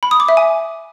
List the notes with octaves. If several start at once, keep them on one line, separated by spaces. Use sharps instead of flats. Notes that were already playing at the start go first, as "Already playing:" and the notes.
B5
D#6
D6
E5
G#5